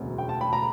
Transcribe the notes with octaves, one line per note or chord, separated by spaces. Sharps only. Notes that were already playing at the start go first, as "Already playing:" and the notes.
Already playing: E1 D2 C#3 F#3 B3
G5
A5
B5
A#5